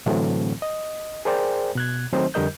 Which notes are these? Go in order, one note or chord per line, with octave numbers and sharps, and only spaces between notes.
A2 D3 E3 F#3 A3 C4
D#5
G#4 A#4 C5 D5 G5
B2 F#6 G#6
D#3 F#3 A3 C4 D#4 C5
F2 D3 G3 A#4 D#5 G6